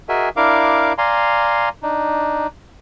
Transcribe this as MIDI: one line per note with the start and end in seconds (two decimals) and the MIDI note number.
0.09 0.29 66
0.09 0.29 68
0.09 0.29 70
0.09 0.29 75
0.09 0.29 76
0.09 0.29 80
0.36 0.93 62
0.36 0.93 64
0.36 0.93 70
0.36 0.93 77
0.36 0.93 86
0.98 1.69 74
0.98 1.69 77
0.98 1.69 80
0.98 1.69 82
0.98 1.69 84
1.83 2.47 62
1.83 2.47 63